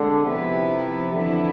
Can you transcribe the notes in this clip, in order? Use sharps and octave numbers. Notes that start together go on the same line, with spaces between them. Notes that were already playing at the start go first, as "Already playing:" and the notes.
Already playing: B2 D3 G#3 C4 G#4
C3 F3 B3 E4 B4
F2 D3 E3 B3 E4